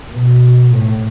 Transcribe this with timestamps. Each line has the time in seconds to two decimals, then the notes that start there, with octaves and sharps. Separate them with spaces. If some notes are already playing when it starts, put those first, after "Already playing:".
0.14 B2
0.74 A2